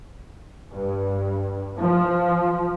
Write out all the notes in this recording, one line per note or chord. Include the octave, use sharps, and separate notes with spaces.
G2
F3